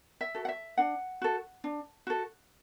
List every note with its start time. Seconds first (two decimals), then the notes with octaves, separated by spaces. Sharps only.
0.21 E5
0.35 F#4 A4
0.45 F#5
0.48 E5
0.77 D4 F#5
1.22 F#4 A4
1.64 D4
2.07 F#4 A4